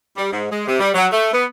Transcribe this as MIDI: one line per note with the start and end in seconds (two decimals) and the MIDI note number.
0.17 0.30 55
0.32 0.47 44
0.51 0.67 56
0.67 0.76 48
0.80 0.90 55
0.94 1.06 54
1.13 1.32 57
1.33 1.44 59